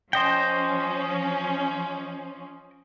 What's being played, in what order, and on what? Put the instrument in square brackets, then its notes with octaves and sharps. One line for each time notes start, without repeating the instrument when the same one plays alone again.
[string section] F3 C#4 [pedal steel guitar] C5 D#5 G5